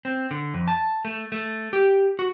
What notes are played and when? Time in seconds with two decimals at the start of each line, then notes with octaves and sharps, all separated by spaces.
0.05 C4
0.31 D3
0.54 F2
0.68 A5
1.05 A3
1.32 A3
1.73 G4
2.19 F#4